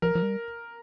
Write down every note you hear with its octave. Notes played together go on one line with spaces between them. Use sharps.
F3 A#4
F3
G3